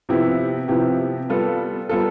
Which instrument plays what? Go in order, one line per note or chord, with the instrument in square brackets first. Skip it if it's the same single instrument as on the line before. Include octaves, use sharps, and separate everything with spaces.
[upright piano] C3 F3 B3 E4 G4
C3 F3 B3 E4 G4
G3 B3 F4 A4
G3 B3 F4 A4